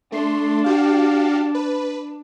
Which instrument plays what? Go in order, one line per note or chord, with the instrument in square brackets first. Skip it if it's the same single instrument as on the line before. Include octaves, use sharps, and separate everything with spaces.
[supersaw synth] A3 C6 [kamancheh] D4
[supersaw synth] F#4 G4 F5
B4